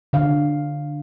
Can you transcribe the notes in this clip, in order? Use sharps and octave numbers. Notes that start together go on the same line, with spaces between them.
D3 F5